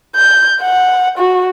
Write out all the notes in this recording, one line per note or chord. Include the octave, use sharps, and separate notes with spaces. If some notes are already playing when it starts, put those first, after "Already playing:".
G6
F#5
F#4